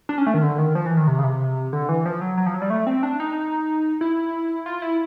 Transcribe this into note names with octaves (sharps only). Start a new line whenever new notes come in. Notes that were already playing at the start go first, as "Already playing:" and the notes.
D4
C#4
A3
D#3
D3
D#3
F3
E3
D#3
C3
C#3
C3
D3
E3
F3
F#3
F#3
F3
F#3
G3
A3
C4
D4
D#4
E4
F4
E4